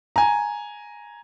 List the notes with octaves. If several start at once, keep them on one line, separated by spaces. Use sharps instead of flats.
G#5 A#5